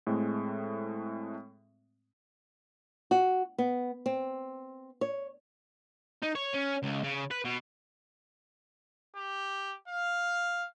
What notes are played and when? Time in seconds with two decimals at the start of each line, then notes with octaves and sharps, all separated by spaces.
0.07 A2 G#3 A3 C4
3.11 F#4
3.58 B3
4.06 C4
5.01 C#5
6.22 D#4
6.35 C#5
6.54 C#4
6.83 C#2
7.03 C#3
7.31 B4
7.45 B2
9.16 G4
9.88 F5